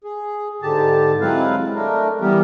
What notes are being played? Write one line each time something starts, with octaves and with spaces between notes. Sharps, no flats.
G#4
G#2 D3 G4 A5
F#3 G#3 C4 E4 B4 F5
A3 D4 A#4
E3 G3 B3 G4 A#4